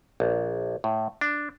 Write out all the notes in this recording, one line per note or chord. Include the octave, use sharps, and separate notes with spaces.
A#1
A2
D4